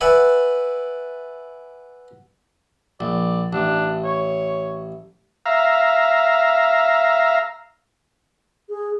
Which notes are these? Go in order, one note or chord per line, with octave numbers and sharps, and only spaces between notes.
B4 D5 E5 F#5 G#5 B5
A#1 D5
A1 D4
C#5
E5 F5 A#5
G#4